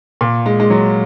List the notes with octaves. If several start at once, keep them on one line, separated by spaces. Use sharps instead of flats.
A#2
G#3
G#3
F#3